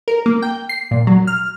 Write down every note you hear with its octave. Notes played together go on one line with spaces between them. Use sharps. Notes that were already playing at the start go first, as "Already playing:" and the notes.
A#4
A#3
G5
C7
A#2
F#3
F6